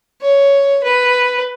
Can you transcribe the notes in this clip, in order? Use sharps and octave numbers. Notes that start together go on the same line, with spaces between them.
C#5
B4